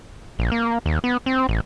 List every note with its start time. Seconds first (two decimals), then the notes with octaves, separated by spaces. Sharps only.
0.39 A#1
0.52 A#3
0.86 D#2
1.04 B3
1.26 C4
1.49 A1